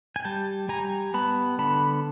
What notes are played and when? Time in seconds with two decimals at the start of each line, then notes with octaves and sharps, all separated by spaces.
0.16 G#5
0.24 G3 G5 A5
0.69 G3 G#5 A#5
1.14 B3 A5 B5
1.58 D3 A5 B5